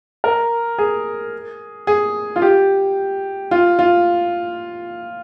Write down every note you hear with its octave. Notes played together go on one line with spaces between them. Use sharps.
A#4
G#4
G#4
F4
G4
F4
F4